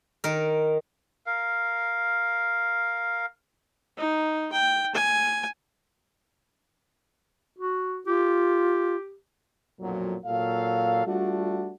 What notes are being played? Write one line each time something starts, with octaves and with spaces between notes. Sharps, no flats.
D#3 A#4
A#4 F5
D#4
G5
G#5
F#4
F4 G4
B1 F2 A#2 F#3
A#2 F#3 A4 F5
G3 A3 D4 F4 F#4